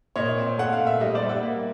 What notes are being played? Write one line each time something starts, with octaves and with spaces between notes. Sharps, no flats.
A#2 C#5 D#5
C4
A3 F#5
F5
A#2
E5
G3 D#5
C5 D5
G3
E5 F#5
A#3